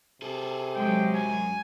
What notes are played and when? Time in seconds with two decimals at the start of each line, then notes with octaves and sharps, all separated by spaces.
0.22 C3 G#4 A4
0.75 F#3 G#3 G5
1.15 F#2 G#5